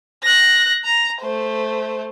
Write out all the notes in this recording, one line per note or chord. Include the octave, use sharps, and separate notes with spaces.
F#6 A#6
A#5
A3 C5